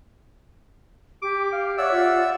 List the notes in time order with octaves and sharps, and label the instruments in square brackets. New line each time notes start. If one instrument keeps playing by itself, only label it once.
[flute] G4 [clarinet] D6
[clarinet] F5
[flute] C#5 [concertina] D5 E5 E6 [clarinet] F#5
[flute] F4